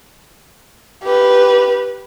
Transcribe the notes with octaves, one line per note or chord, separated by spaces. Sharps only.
G4 B4